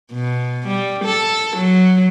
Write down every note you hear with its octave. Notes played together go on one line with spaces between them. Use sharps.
B2
G3
A4
F#3